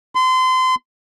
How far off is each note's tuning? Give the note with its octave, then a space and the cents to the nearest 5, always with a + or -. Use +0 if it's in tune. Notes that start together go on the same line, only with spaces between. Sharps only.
C6 -30